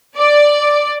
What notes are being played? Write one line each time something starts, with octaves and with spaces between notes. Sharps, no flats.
D5